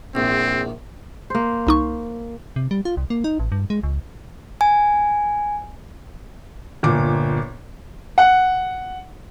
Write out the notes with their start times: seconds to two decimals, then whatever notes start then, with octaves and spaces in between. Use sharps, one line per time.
0.15 A#1 E2 C4
1.30 A#3 C5
1.67 C2 D#4 C#6
2.56 C3
2.71 G3
2.85 F4
2.97 C2
3.10 A#3
3.24 D#4
3.39 A1
3.52 G2
3.70 G#3
3.83 C#2
4.61 G#5
6.83 G1 A#2 D6
8.18 F#5